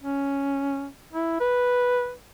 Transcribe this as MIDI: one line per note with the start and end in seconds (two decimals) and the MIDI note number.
0.03 0.88 61
1.13 1.36 64
1.40 2.12 71